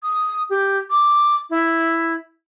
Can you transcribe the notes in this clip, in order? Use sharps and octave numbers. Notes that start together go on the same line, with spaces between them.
D#6
G4
D6
E4